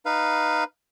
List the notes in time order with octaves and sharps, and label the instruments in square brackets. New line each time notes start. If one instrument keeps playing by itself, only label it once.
[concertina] D#4 B4 F5